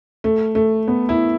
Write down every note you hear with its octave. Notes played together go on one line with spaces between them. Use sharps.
A3
A3
B3
E4